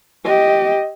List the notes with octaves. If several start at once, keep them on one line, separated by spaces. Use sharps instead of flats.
G4 D#5